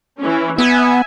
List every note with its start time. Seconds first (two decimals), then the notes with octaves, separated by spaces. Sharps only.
0.19 E3 C#4
0.58 B3 E5 G#5